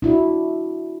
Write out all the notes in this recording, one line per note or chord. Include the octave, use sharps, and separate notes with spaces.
D4 E4 F#4